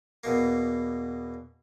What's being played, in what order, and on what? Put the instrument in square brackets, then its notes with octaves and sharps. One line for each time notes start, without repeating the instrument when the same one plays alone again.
[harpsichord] E2 B2 A#3